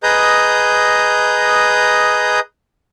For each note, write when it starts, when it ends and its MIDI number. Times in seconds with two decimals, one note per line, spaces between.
0.03 2.40 68
0.03 2.40 71
0.03 2.40 75
0.03 2.40 82
0.03 2.40 87
0.03 2.40 91